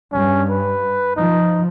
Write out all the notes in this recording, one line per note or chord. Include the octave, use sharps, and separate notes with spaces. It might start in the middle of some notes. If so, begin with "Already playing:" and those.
G2 C#4
B4
F3 D#4